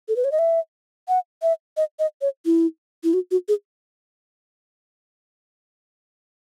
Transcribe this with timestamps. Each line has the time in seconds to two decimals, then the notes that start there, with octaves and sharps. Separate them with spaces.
0.09 A4
0.16 B4
0.24 C#5
0.32 D#5
0.39 E5
1.08 F#5
1.42 E5
1.77 D#5
1.99 D#5
2.21 C#5
2.46 E4
3.04 E4
3.14 F#4
3.31 F#4
3.48 G#4